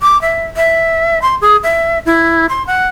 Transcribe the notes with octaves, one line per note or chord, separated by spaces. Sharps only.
D6
E5
E5
C6
G#4
E5
E4
C6
F#5